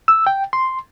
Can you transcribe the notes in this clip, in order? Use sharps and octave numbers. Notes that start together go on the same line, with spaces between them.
E6
G5
C6